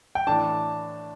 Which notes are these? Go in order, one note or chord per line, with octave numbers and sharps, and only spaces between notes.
G5
A2 E3 A3 D4 A5